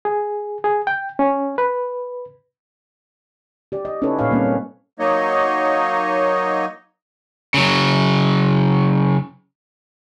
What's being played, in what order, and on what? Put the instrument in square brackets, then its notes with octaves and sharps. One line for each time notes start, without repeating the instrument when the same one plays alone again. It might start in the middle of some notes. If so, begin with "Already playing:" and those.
[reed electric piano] G#4
G#4
G5
C#4
B4
[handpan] G4 D5
D#5
C#4 D#4 E4 A4 B4 C#5
A#2 B4 C#5 F5
G3 A#3 C4 C#4
C4
[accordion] F#3 A#3 D#4 C#5 D#5
[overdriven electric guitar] C#3 F#3